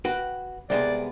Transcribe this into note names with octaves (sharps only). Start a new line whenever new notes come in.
F#4 B4 G5
C2 G#3 B3 D5